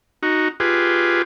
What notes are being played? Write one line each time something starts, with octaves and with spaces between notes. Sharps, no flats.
D#4 F#4
F4 G4 G#4 B4